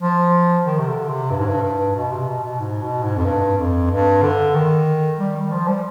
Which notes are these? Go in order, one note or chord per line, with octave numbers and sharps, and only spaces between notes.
F3
D#3
C3
D3
C3
G2
G#2
G2
G2
B2
C3
B2
B2
G#2
B2
G#2
F2
G2
F2
G2
D3
D#3
G3
D#3
F3
G3